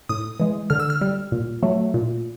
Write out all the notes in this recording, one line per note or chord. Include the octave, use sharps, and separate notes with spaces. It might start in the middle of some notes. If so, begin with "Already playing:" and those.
A2 D#6
E3 G#3
D3 F6
E6
F6
G3
A#2
F#3 A3
A#2